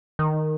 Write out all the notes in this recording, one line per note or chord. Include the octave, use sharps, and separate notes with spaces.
D#3